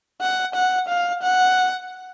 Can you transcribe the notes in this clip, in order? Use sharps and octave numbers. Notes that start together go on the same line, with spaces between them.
F#5
F#5
F5
F#5